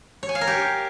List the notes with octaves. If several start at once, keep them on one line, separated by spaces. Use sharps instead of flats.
C#5
G#5
F5
A#4
G4